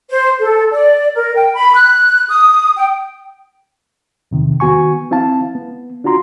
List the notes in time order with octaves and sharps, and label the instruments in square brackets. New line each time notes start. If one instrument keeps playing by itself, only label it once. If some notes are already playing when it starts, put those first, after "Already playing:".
[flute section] C5
A4
D5
A#4
G5
B5
F#6
D#6
G5
[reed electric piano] E2 C3 D#3
D#3 B3 F#4 G#5 C#6
C4 E4 F5 A5
B3
D4 F4 F#4 A#5 C6